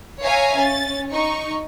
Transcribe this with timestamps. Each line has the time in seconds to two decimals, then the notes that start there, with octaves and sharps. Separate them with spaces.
0.22 C#5 E5 F5 G#5 A#5
0.60 C#4 A6
1.13 D#4 C#6